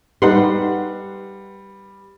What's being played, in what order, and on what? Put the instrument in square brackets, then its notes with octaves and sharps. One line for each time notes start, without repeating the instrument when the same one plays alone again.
[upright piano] G3 [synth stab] D#4 F#5 C6 [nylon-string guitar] B4